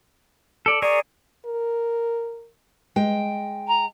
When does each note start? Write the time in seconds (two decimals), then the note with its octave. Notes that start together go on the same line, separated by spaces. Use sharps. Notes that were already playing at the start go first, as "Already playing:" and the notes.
0.66 A4 D5
0.82 G#4 A#4 C#5 D5
1.46 A#4
2.96 G#3 G5
3.68 A#5